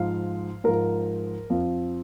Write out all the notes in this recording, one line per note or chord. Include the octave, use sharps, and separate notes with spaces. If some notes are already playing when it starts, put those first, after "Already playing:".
Already playing: G#2 F3 F5
G#2 F3 A#4
F2 F3